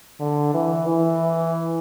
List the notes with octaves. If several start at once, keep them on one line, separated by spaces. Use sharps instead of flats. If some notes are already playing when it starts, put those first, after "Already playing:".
D3
E3
E3